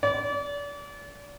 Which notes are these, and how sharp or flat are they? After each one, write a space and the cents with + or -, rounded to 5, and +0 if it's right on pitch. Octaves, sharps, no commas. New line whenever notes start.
D5 -35